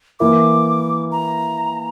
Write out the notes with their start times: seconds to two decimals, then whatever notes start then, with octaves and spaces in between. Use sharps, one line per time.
0.20 E3 A#3 E4 A#4 D6
1.12 A#5